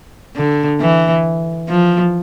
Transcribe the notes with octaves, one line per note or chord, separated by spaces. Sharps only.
D3
E3
F3